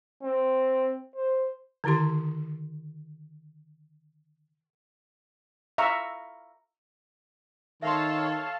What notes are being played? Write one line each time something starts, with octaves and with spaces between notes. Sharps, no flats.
C4
C5
D3 D#3 E4 G4 C6
E5 F5 A#5 C#6
D#3 A4 C#5 E5 F5 A5 C6